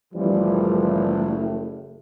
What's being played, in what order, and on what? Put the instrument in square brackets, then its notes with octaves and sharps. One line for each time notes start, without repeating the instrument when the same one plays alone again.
[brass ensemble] F#1 A2 A3 [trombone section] E3 F3 G3